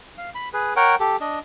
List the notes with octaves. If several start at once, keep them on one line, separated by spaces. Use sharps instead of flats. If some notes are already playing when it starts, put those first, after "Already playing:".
F5
B5
G#4 B4
A#4 C#5 F#5 G5
G4 A4
D4 D#5